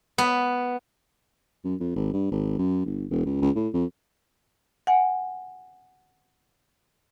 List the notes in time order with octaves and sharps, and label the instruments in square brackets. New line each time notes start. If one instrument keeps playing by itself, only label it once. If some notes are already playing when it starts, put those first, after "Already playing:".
[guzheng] B3
[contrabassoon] F#2
F2
G#1
G2
G#1
F#2
G1
E1
C#2
C#2
A2
F2
[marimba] F#5 G#5